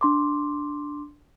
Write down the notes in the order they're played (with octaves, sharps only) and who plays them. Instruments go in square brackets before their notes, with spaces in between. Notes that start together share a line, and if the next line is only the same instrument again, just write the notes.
[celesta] D4 C6 D6